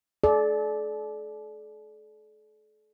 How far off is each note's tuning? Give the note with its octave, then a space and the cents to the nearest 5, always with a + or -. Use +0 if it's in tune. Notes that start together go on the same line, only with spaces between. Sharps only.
A4 -45 D5 +0